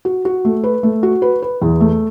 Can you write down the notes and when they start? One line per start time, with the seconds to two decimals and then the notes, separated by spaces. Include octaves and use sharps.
0.05 F#4
0.25 F#4
0.45 A3
0.64 B4
0.83 A3
1.03 F#4
1.22 B4
1.42 B4
1.62 E2
1.80 A3